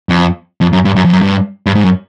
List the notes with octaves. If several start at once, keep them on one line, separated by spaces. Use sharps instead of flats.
F2
F2
F#2
G2
F#2
F2
F#2
G2
G2
G#2
F#2